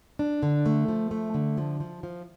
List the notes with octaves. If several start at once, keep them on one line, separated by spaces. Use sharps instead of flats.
D4
D3
A3
F3
A3
D3
F3
F3
F3